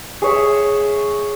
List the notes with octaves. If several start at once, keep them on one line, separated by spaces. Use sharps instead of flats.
G#4 C#5 E5